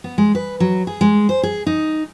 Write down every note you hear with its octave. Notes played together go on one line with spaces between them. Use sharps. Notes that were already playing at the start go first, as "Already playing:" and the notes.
B3
G#3
B4
F#3
G#4
G#3
C5
G#4
D#4